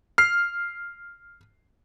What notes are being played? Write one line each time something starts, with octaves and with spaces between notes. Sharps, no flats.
F6 C7